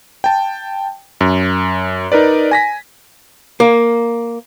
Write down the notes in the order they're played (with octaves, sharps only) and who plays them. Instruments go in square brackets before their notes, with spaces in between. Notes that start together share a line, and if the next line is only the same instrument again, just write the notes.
[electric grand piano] G5 A5
F#2
D#4 A#4 B4 D5
G#5 A#6 B6
[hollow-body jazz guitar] A#3